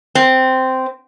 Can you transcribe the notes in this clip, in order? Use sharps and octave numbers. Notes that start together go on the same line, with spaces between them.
C4